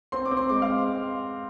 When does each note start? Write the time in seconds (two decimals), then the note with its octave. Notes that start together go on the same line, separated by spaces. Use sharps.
0.12 C4 C6
0.25 D6
0.31 C4
0.37 C6
0.49 G#3 D6
0.62 F5